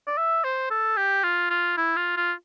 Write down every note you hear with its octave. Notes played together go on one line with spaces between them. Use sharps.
D5
E5
C5
A4
G4
F4
F4
E4
F4
F4